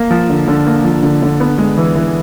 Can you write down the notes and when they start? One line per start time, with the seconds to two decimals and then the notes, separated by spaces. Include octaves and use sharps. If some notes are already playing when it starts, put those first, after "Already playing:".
Already playing: A#3
0.11 F3
0.30 D3
0.48 D3
0.67 A#3
0.84 F3
1.03 D3
1.22 D3
1.40 B3
1.58 G#3
1.77 E3
1.95 E3